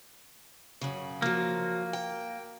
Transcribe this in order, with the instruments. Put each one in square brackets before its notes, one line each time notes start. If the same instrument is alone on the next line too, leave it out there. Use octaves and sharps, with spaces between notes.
[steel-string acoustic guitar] F#2 C#3
[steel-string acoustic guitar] F3 F#3 [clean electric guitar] A#3
[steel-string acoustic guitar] G5